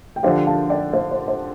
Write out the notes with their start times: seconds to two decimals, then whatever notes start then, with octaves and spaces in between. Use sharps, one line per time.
0.16 G5
0.23 D3 F3 D4 G4 C5 F5
0.47 F5 A5
0.70 D5 G5
0.93 C5 F5
1.12 C5
1.28 C5